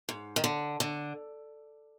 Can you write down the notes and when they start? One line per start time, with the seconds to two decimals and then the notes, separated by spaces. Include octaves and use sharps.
0.09 G#2
0.36 D#3
0.44 D3
0.80 D3